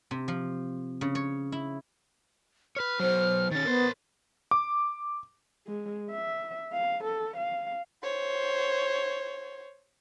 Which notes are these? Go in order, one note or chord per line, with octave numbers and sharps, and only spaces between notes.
C3
F3
C#3
C#5
E4
B4 C#5 F6
F#3 B3 C5
D#3 C#4 A6
B3 A#4 C5
D6
G#3
E5
F5
A4
F5
C5 C#5